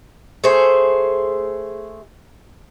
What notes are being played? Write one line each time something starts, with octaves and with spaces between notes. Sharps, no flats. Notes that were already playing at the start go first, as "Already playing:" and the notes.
A3 G#4 C5